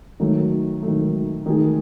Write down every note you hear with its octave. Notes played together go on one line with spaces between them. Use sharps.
D#3 F#3 A3
D#3 F#3 A3
D#3 A3 D#4 G#4